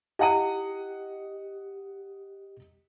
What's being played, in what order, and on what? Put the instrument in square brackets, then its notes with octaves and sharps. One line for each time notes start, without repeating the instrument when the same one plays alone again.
[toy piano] D#4 E4 [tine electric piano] G4 [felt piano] D#5 F#5 D#7